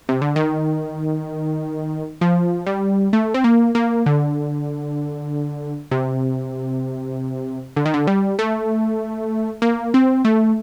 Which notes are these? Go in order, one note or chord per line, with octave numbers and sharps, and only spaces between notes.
C3
D3
D#3
F3
G3
A3
C4
A#3
A#3
D3
C3
D3
D#3
D3
G3
A3
A#3
C4
A3